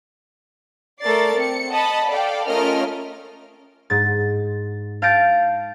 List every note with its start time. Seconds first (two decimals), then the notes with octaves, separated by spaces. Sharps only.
1.01 A3 A4 A#4 D5 A6 C7
1.36 C4 C#7
1.71 D#5 F#5 A5 B5
2.07 A4 D5 F5 G5
2.47 A3 C#4 F4 A#4 D#5 F6
3.90 G#2 A6
5.02 F5 A5 G6 A6 A#6 D7